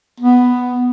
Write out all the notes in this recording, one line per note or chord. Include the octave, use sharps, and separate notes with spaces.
B3